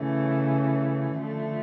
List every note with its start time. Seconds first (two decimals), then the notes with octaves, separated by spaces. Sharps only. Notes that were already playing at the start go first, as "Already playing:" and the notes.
Already playing: C#3 E3 A3 C#4
1.17 D3 F3 A3